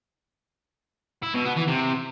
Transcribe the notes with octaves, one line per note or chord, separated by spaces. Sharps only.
E4
B2
B3
E3
C3